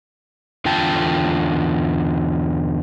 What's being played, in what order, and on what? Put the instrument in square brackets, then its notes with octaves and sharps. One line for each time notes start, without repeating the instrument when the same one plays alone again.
[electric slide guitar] E2 D3 F4 G5 A5